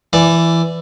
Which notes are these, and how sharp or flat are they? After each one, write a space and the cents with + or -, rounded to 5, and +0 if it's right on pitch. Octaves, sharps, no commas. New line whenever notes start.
E3 +15 D5 +0